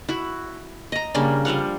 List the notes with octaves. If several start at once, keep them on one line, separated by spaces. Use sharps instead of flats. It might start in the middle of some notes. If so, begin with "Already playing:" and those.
E4 F#4
D#5 A#5
C#3 G3 A#3 D4
F3 G3 F5 F#5